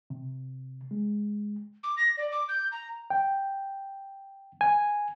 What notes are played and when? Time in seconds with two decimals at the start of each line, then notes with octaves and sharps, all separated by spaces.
0.10 C3
0.91 G#3
1.83 D6
1.97 A#6
2.17 D5
2.32 D6
2.48 G6
2.72 A#5
3.10 G5
4.61 G#5